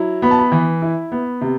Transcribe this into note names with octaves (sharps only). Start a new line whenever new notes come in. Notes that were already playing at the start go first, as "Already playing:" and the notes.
Already playing: F#3 E4
B3 B5
A5
B5
E3
E4
B3
C3